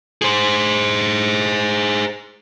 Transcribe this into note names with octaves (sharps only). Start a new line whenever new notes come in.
G#4 C5